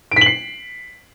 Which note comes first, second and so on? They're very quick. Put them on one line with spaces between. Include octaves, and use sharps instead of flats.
D7 B6 F#7 C7